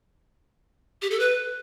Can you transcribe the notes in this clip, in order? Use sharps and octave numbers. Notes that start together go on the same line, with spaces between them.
G4
A4
B4